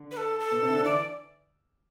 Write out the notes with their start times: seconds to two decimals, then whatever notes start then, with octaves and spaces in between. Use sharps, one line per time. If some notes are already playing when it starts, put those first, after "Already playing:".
Already playing: D3 D4
0.11 B4
0.17 A4
0.40 A4
0.51 B2 B3
0.62 C3 C4
0.69 E4
0.74 D3 D4
0.85 E3 E4 D5